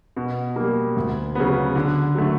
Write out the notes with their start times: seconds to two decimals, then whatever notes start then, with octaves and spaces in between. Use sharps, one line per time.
0.16 B2
0.56 G3 A#3
0.97 D2
1.35 C#3 F#3 B3
1.75 D3
2.15 F#3 A3